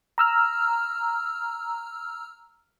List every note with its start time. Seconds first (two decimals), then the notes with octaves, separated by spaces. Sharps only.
0.18 A#5 E6 F6